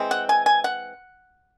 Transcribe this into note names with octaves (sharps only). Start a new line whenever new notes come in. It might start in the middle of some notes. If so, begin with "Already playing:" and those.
Already playing: E3 G#3 C4
F#5
G#5
G#5
F#5